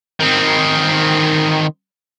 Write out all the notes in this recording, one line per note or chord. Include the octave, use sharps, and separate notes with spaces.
D#3 C4